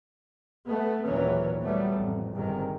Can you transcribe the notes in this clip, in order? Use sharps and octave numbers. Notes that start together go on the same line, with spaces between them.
A3 B3
G#1 D#2 A#2 E3 F#3 C#4
F#3 G3 A3 B3
A1 F2
G1 G#2 C3 D#3